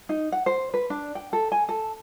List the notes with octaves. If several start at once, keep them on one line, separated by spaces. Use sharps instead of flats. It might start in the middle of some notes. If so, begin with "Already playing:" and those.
D#4
F#5
C5
B4
D4
G5
A4
G#5
A4